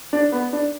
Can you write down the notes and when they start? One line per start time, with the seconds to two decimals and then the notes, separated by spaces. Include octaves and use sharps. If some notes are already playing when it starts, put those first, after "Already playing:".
0.13 D4
0.32 B3
0.53 D4